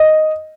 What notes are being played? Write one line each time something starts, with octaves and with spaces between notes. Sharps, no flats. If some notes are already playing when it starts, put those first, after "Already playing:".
Already playing: D#5